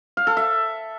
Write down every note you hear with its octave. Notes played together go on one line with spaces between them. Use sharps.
F5
A4
E5